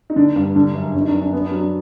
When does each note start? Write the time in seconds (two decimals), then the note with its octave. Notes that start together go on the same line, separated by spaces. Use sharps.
0.10 D#4
0.16 D3 D4
0.36 G2
0.55 D3 D4
0.75 F#2
0.94 D3 C#4
1.01 D#4
1.07 D4
1.14 F#2
1.20 D4
1.32 B3 D4
1.46 D4
1.52 F#3
1.58 D4